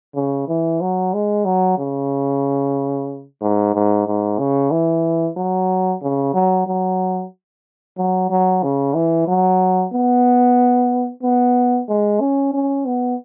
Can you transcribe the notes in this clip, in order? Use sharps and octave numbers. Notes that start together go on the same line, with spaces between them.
C#3
E3
F#3
G#3
F#3
C#3
G#2
G#2
G#2
C#3
E3
F#3
C#3
F#3
F#3
F#3
F#3
C#3
E3
F#3
B3
B3
G#3
C#4
C#4
B3